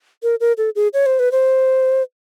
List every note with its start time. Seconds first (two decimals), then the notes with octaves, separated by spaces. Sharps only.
0.23 A#4
0.40 A#4
0.58 A4
0.76 G#4
0.94 C#5
1.06 C5
1.19 B4
1.32 C5